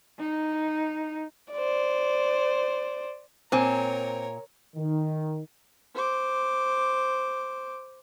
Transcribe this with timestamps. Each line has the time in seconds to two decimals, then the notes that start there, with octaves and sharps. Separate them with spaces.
0.19 D#4
1.52 C5 D5
3.52 A#2 C4 A#4 C#5 G#5
4.76 D#3
5.95 C5 D6